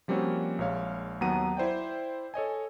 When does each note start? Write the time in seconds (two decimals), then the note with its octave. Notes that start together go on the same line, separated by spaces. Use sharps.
0.08 F3 G3 A#3 C4 C#4 F#4
0.59 A#1 G#3 C#5 F5
1.21 D#2 F#3 B3 F#5 A#5 D#7
1.57 E4 C5 D5 G5
2.34 A4 C#5 D#5 G#5